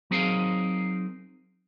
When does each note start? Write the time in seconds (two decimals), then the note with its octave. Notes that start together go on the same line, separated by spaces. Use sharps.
0.11 F#3 C4 D#4 G#4 A#4 F5